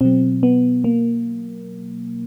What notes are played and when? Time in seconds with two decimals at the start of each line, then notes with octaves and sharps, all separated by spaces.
0.01 B2 F#3 C4
0.43 B3
0.84 A#3